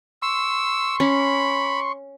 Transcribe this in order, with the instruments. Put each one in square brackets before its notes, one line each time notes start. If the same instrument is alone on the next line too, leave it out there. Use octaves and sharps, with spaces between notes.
[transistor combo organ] C6 C#6 [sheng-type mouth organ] E6
[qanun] C#4 [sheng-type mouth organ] B5